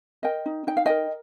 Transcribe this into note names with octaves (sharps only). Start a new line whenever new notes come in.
A#4 D#5 G5
D#4
D#4 G5
F5
A#4 D#5 G5